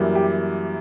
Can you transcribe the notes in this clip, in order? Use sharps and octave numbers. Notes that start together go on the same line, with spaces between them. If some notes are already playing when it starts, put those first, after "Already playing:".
Already playing: F#2 E3 G3 A#3
G4